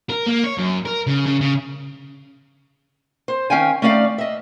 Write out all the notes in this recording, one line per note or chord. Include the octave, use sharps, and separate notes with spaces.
A#4
A#3
C#5
F#2
A#4
C#3
C#3
C#3
C5
D#3 C#4 F5 G5 G#5
A3 C#4 D#4 D5 F5
D#5 E5